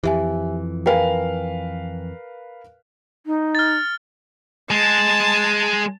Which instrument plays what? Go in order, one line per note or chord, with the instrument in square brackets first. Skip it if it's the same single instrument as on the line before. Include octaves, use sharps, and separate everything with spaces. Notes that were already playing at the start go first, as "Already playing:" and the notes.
[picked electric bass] F2 E3 [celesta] G4 E5 G#5
[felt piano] A#4 B4 F5 [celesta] G5 G#5
[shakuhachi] D#4
[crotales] F6 A6
[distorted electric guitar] G#3 [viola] A5